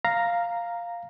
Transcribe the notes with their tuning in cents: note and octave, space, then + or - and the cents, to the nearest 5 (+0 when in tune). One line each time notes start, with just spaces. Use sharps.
F5 +0 A#5 +0